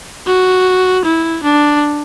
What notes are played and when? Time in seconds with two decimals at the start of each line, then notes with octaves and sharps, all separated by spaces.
0.27 F#4
1.05 E4
1.44 D4